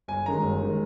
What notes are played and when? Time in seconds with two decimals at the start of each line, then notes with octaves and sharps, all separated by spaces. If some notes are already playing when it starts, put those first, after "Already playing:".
0.08 G1 G#5
0.26 F#2 D#3 G#3 A#5
0.43 G1
0.63 D#3 G#3